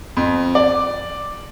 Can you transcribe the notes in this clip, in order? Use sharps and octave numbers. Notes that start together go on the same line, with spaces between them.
F2
D5